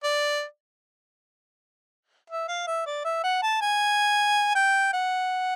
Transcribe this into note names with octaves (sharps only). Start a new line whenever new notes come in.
D5
E5
F5
E5
D5
E5
F#5
A5
G#5
G5
F#5